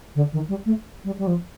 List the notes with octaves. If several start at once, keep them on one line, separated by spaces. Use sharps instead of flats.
D3
D#3
G3
A3
G3
G3
F3